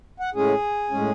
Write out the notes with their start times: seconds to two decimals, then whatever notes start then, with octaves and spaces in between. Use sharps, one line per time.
0.20 F#5
0.34 A2 G#3 C#4 G#4
0.91 A2 G#3 C#4